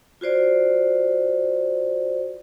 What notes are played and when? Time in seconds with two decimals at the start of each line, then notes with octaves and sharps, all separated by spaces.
0.21 F4 F#4 C5 D5